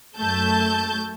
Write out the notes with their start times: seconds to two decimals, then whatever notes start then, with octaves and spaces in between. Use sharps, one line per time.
0.18 F#2 A3 A5 G6